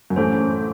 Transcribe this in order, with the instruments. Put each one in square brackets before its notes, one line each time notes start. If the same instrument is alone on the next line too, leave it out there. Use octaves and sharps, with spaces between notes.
[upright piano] F#2
[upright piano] A1 A2 [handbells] C#4 A4 C5